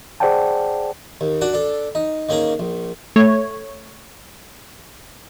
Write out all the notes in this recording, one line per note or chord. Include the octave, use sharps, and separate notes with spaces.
G#4 C5 D5 F#5 G5 A5
D#2
D4 F#4 F#5
D4 A4
D#4
D#3 A#3 C#4 G#4 A#5
A#1
A3 C#5